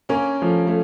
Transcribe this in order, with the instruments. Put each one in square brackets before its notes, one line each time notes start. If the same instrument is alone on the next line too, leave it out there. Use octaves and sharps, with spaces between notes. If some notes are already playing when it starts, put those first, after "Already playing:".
[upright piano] A#3 [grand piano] C#4
[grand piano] F3 [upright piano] A3
[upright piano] A3